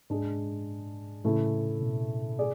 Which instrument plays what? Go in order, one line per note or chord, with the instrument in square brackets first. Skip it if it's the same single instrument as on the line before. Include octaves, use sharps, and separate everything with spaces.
[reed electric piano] G#2 [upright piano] G#3 D4 G#4
[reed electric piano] A2 [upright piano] C#3 E3 A3 E4
[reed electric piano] B2
[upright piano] G#4 D5